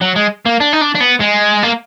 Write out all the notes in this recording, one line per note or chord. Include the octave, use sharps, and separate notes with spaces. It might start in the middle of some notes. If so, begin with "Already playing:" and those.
F#3
G#3
A#3
D4
D#4
D4
D4
B3
G#3
A#3